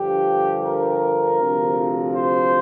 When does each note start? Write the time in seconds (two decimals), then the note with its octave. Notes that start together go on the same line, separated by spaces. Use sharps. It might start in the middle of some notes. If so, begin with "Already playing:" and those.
Already playing: G2 D3 F3 G4
0.64 A#4
1.39 D2 C3 F3
2.14 C5